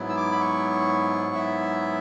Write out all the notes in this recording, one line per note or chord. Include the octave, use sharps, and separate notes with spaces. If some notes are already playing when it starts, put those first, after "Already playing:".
Already playing: G#2 F#3 B3 E4
E6
D6
B5
C#6
E5